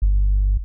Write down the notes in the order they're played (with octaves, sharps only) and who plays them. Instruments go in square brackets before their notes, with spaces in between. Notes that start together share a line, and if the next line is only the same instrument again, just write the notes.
[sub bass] G1